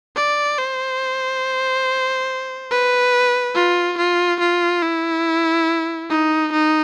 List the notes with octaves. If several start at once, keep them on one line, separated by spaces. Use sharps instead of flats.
D5
C5
B4
F4
F4
F4
E4
D#4
D#4